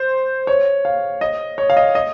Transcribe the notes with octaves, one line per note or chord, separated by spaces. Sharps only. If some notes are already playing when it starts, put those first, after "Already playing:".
Already playing: C5
C#5
F5
D#5
C#5
F5
D#5
D#5